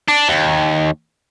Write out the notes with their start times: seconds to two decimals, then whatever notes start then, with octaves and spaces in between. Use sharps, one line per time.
0.08 D4
0.28 D#2